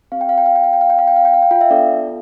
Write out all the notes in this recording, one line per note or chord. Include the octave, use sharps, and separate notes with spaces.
C4 G4 F5
G5
F5
G5
F5
G5
F5
G5
F5
G5
F5
G5
F5
G5
F5
G5
F4 F5
E5
B3 D4 F4 A4 D5